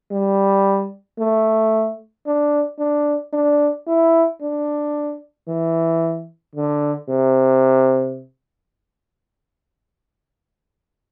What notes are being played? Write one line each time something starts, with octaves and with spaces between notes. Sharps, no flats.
G3
A3
D4
D4
D4
E4
D4
E3
D3
C3